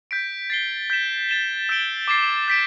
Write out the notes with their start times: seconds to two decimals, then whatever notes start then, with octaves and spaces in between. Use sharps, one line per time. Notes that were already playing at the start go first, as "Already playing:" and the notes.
0.11 G6 B6 D7
0.50 A6 C7 G7
0.90 G6 B6 E7
1.29 A6 E7 G7
1.69 E6 G6 D7 G7
2.08 D6 A6 C7
2.48 G6 B6 D7